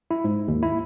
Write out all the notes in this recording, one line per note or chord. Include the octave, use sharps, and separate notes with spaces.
E4
G#2
D#2
E4